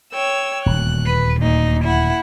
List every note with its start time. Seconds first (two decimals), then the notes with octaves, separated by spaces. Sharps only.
0.14 C#5 G5 E6
0.66 D#1 D2 F#6
1.07 B4
1.41 A#2 D#4
1.83 E4 F#5